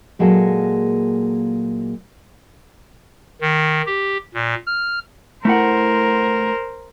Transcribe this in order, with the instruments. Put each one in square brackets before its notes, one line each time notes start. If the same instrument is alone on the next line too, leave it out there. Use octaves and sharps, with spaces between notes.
[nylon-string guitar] A#2 F#3 G#3 A#3 G#4 A4
[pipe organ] D#3
G4
A#2
F6
[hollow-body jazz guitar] A3 E4 F#5 [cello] A#4 C5